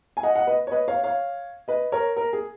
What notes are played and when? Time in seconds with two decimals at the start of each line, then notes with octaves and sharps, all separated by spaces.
0.17 G#5
0.23 D#5 F#5
0.35 D#5 F#5
0.47 B4 D#5
0.67 C#5
0.71 B4 D#5
0.88 C#5 F5
1.04 C#5 F5
1.68 B4 D#5
1.92 A#4 C#5
2.16 A#4
2.33 G#4